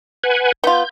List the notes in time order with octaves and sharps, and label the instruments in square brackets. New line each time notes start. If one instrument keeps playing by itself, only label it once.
[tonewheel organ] B4 F#5 G#5
[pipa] B3 F4 [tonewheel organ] G6